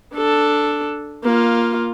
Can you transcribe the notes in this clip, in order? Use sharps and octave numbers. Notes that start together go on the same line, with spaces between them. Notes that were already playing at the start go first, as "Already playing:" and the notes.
D4 A4
A#3 F4